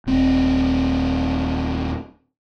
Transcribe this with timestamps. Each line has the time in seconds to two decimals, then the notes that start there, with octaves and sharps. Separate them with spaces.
0.07 D#1 C4